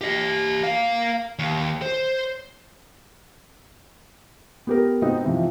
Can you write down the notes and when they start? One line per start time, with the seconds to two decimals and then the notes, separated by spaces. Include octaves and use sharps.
0.01 G4 D#5
0.64 A#3 F5
1.39 D#2
1.82 C5
4.67 B3 G4 A#4
5.02 B3 C4 D#4 F#4
5.23 C3 E3 F3